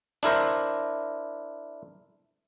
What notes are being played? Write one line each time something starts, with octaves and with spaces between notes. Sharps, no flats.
D4 E4 A#4 C5